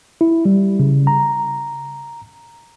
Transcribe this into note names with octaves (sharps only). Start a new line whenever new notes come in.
E4
G3
C#3
A#5